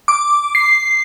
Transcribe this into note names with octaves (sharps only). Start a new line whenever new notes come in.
D6
C7